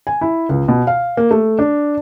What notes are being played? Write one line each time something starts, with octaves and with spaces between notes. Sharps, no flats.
G#5
E4
C#2
B2
F5
A#3
A3
D4